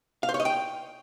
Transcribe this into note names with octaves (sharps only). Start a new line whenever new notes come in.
F5
C5
C#5
D#5
G5